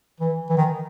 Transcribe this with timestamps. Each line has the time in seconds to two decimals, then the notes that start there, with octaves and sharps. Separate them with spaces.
0.21 E3
0.50 E3
0.57 D#3